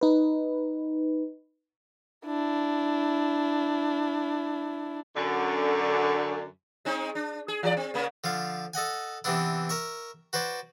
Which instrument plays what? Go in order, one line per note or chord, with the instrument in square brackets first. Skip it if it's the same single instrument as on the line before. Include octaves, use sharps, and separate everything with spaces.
[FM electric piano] D#4 B4
[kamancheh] D4 E4
[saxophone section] F#2 D3
[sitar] G#3 C4 D#4
D4
G#4
E3 D5
C4
C#3 A#3 C#4
[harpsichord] D3 F3 F5
A4 D#5 F#5 G#5
C3 E3 B3 D4 E4
A#4 E5 C#6
F#4 B4 C5 D5